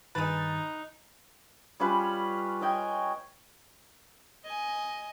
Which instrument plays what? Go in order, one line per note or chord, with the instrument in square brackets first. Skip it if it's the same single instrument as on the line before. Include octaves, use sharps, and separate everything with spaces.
[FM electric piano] G2 D#3 A6 [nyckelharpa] D#4 [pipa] G#4 B4
[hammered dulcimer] G3 C#4 F4 B4
C#5 D#5 G5 G#5
[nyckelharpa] D#5 G#5